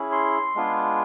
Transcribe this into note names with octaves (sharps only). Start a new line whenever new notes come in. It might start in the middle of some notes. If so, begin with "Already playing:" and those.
Already playing: C#4 E4 G#4
C6
G#3 B3 D4 F4 G#4